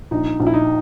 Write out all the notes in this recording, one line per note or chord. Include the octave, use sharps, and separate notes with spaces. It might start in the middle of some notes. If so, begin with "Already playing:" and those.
A#1 D#4
A#1
E4
D#4